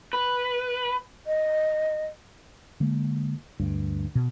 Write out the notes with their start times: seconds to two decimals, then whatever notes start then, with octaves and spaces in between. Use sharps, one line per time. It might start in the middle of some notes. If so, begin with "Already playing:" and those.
0.13 B4
1.27 D#5
2.80 D3 G#3 A#3
3.60 D2 G2
4.15 B2